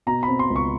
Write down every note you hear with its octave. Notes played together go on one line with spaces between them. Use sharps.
B2 A#5
C4 B5
C6
C#2
C#6